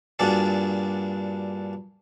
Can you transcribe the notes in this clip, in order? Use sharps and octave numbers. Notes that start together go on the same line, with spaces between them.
G2 A#2 D4 F#4 G#4 D5